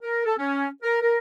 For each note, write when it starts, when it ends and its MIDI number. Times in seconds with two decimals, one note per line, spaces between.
0.03 0.23 70
0.25 0.34 69
0.38 0.68 61
0.83 1.00 70
1.02 1.18 70